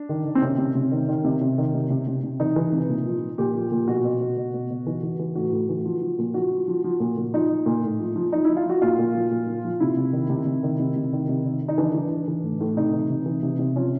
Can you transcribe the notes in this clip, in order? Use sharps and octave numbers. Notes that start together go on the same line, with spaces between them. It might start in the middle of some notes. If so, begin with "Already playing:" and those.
Already playing: D4
D#3
D#3
C4
C3 C#4
C3
C3
D#3
D#3
C3
C3
D#3
C3
C3
C3
C3
E3 D#4
E3
C3
A#2
F3
F3
A#2 G4
F3
A#2
B2 F#4
B2
B2
B2
B2
B2
E3
E3
E3
A2 F#4
A2
E3
F3
F3
A#2
F3 F#4
F3
F3
F3
A#2
A#2
F3 D#4
F3
A#2
A2
F3
F3
F3 D#4
F3 E4
F4
F3 F#4
A#2 F4
A#2
F3
A#2
F3
F3
C3 E4
C3
D#3
C3
C3
D#3
C3
C3
D#3
C3
D#3
D#3
D#4
E3 D4
E3
E3
E3
A2
A2
C3 D#4
E3
C3
E3
C3
C3
F3 C#4